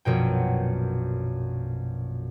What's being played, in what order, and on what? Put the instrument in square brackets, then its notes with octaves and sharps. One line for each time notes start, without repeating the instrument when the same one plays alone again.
[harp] A#1 F#2 B2 G5